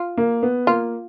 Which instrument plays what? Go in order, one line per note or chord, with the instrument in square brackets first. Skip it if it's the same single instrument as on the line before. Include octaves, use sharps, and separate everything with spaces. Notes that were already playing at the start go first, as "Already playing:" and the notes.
Already playing: [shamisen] F4
[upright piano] A#3
B3
[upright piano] A#3 [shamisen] F4